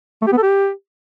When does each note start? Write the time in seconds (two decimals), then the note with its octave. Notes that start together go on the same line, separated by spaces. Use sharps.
0.22 A3
0.27 G4
0.32 B3
0.37 A4
0.43 G4